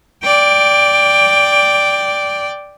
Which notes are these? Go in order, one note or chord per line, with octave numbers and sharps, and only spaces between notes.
D5 G5